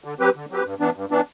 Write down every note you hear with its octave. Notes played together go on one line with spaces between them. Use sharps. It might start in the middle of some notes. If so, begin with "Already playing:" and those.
D3
F#3 C4 G4 B4
D3
F#3 C4 G4 B4
G2
E3 B3 D4
G2
E3 B3 D4